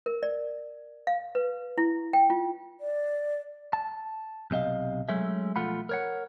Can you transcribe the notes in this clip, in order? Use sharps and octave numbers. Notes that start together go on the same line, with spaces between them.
A#4
D5
F5
B4
E4
G5
F4
D5
A5
B1 C3 D#5 F5
F#3 G#3 A3 C#4 E5
B1 F3 A3 F4 F#5 B5
A#4 C#5 F#5